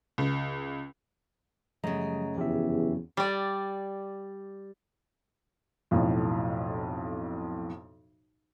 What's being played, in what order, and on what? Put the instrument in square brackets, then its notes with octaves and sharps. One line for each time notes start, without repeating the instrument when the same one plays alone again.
[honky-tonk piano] C#2
[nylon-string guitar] F#2 C#3 [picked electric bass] F3 G3 [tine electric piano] A3 D#5 A#5
[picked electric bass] F1 F3 F#3 [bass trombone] E2 [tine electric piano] G4 E5
[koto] G3 D5
[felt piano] B1 F2 A2